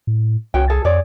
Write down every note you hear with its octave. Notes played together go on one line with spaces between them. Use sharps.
A2
C2 C#4 F#4 G5
G#4 A4 A5
F2 G#4 C#5 D5